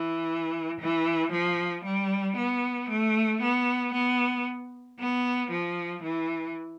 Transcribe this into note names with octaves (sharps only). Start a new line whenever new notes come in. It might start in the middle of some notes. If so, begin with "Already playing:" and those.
Already playing: E3
E3
F3
G3
B3
A3
B3
B3
B3
F3
E3